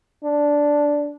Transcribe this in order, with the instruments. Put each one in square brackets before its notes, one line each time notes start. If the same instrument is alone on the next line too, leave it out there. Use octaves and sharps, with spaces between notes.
[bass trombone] D4